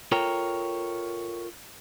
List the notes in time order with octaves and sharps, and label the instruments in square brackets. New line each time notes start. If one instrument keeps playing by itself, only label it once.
[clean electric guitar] F4 A4 A#4 C#5 G5 A#5